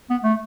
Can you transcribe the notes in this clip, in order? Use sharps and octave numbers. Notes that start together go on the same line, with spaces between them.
B3
A3